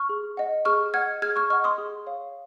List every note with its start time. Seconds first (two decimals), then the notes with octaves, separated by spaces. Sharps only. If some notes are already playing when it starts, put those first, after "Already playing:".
Already playing: C#6 F6
0.09 G#4
0.37 D#5 F#5
0.65 G#4 C#6 F6
0.94 D#5 F#5 F6 G#6
1.22 G#4 F6 G#6
1.36 C#6 F6
1.50 D#5 F#5 C#6 F6
1.64 C6 D#6
1.78 G#4
2.06 C#5 F5